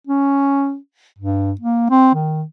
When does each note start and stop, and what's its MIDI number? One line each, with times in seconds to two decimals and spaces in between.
0.07 0.77 61
1.18 1.52 43
1.61 1.88 58
1.90 2.14 60
2.15 2.43 51